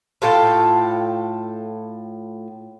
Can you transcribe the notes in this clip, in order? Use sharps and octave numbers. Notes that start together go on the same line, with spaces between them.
A2 F4 A4 G5